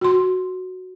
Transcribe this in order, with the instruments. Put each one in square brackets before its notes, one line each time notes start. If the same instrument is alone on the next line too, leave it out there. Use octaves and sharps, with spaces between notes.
[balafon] F#4 C6